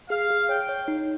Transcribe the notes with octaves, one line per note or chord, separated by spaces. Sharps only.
G#4 F5
G#4
C#5 G5
C#5
D#4